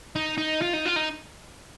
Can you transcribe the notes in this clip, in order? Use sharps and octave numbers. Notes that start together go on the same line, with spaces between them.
D#4
D#4
F4
D#4
F4
D#4